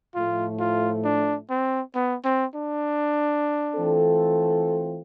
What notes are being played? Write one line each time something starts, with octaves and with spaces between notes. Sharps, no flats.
A2 F3 A3 F4
F4
D4
C4
B3
C4
D4
E3 A3 C4 F4 A4